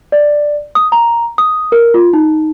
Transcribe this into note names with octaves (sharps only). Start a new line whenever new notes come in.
D5
D#6
A#5
D#6
A#4
F4
D#4